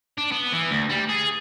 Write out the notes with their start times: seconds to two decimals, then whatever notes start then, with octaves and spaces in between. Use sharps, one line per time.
0.18 D4
0.32 B3
0.53 E3
0.71 D2
0.90 G3
1.09 G#4